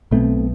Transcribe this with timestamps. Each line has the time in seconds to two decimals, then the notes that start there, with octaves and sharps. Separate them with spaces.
0.11 B1 B2 A3 C4